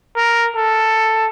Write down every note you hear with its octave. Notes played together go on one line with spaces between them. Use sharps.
A#4
A4